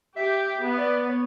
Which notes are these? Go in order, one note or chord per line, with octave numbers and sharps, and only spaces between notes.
G4 E5
E5
B3
E5
D5
C#5